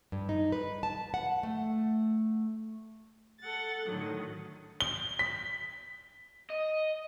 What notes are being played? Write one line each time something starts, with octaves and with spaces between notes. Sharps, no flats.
G2
D#4
B4
A5
F#5
A3
A4 F#5 A6
A2 D3 D#3 F#3
G7
B6
D#5